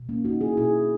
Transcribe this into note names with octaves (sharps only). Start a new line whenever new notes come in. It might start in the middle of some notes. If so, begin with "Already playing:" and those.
Already playing: B2
A#3 C#4
A#3 D#4 F#4
E4 G#4
B2 E4 G#4